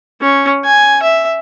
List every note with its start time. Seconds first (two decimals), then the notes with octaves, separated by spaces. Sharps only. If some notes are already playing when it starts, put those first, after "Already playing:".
0.21 C#4
0.65 G#5
1.03 E5